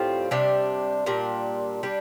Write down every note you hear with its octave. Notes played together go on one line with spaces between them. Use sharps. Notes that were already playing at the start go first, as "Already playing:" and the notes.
Already playing: A2 G3 C4 F4
C3 G3 D4
A#2 G3 D4
G3 D4